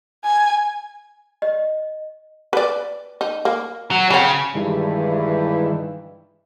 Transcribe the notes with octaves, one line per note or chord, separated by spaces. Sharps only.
G#5
D#5
B4 D5
D#4
A#3
F#3
C#3 F#3 C4
G2 D#3 E3 G#3 E4